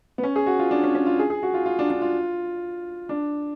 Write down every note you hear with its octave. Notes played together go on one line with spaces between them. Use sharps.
B3
C#4
G#4
F#4
F4
D4
C#4
C#4
F4
G#4
G#4
F#4
F4
F4
D4
D4
F4
D4